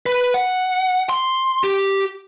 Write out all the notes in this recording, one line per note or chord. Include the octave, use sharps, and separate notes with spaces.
B4
F#5
C6
G4